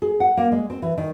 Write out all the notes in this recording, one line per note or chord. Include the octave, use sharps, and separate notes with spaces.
G#4
F#5
A#3
G#3
C4
E3
D#3